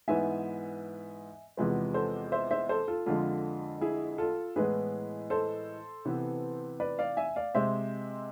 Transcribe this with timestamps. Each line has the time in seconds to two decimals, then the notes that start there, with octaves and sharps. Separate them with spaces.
0.08 G#2 E3 B3 E5 G#5
1.57 E2 C3 F3 G#3 B3
1.94 A4 C5
2.32 C5 E5
2.51 C5 E5
2.69 A4 C5
2.88 F4 A4
3.06 F2 D3 F3 G#3 F4 A4
3.81 E4 G#4
4.18 F4 A4
4.56 A2 E3 G#3 B3 G#4 B4
5.30 A4 C5
6.05 C3 E3 B3
6.80 B4 D5
6.99 D5 F5
7.17 E5 G#5
7.36 D5 F5
7.55 C3 G#3 C4 C5 E5